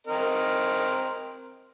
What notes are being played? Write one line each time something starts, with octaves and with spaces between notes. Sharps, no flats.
C4 A#4 D#5